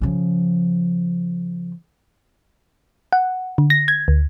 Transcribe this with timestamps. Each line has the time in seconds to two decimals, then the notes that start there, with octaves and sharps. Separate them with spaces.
0.01 C#3 F3
3.13 F#5
3.58 D3
3.70 A#6
3.88 G#6
4.08 D2